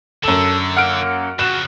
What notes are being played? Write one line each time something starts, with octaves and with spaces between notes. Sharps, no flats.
F#2 D3 A4 E7
A#3 F#5 F6 D7
F2 C#3 F#4 F#6 E7